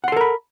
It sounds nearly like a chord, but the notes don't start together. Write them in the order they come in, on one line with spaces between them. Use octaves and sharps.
F#5 C6 A4 A#4 B5